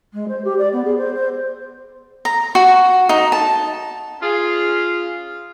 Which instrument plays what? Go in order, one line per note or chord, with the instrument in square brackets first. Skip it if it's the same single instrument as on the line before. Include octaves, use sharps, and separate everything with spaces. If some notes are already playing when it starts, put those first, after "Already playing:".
[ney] G#3
C5
G4
D5
B3
G#4
C5
C5
[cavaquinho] A#5
F#4
D#4
A5
[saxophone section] C#4 F4 G#4